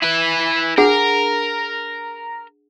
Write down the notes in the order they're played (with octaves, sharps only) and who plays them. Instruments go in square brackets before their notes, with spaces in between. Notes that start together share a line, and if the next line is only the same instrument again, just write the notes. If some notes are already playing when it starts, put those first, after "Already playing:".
[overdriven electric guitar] E4 B4
[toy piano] D4 G#4 F#5 [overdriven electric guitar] A#4